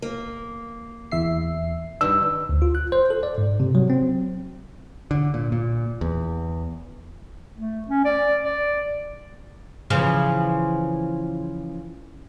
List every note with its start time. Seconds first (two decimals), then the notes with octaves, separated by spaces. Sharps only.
0.02 A#3
1.12 E2 E5 C7
2.01 E2 G2 D#3 D4 E6
2.49 D2
2.62 F4
2.75 F#6
2.92 C5
3.10 A4
3.23 D5
3.38 G#2
3.60 C3
3.75 F#3
3.90 C4
5.11 D3
5.34 A#2
5.52 A#2
6.01 E2
7.55 A3
7.88 C#4
8.05 D5
8.44 D5
9.90 C#3 E3 F3